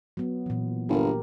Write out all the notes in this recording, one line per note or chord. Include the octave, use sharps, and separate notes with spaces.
F#3 B3
A#2 E3
G1 G4 A#4